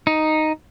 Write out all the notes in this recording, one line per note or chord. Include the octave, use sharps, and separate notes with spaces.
D#4